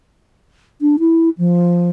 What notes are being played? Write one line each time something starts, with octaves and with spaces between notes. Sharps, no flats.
D4
E4
F3